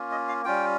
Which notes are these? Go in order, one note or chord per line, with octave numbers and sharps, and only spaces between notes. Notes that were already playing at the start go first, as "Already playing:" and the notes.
Already playing: A#3 C#4 F4
D#5
F5
G3 C#4 F4 G5